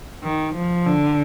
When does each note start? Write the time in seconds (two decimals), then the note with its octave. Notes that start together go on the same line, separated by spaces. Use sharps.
0.24 D#3
0.55 F3
0.86 D3